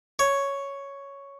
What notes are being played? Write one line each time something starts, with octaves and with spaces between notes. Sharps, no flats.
C#5